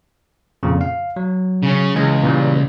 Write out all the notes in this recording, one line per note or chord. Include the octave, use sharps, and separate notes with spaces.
F2 A#2 C#3
F5
F#3
C#3 C#4
C#2 E3 G#3 C#4
A#2 E3 G3